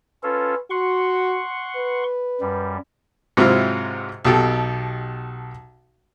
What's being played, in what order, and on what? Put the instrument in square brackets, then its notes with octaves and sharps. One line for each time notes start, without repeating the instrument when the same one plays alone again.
[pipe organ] C#4 F4 A4 [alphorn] B4
[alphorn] F#4 [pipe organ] F#5 C6 C#6
[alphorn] B4
[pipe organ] F#2 G3
[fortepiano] G#2 C3 F#3 C4 E4 F4
B1 B2 G4 A4